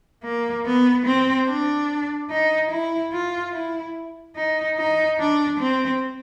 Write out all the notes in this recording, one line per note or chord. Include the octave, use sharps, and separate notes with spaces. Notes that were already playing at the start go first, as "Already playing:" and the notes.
A#3
B3
C4
D4
D#4
E4
F4
E4
D#4
D#4
D4
C4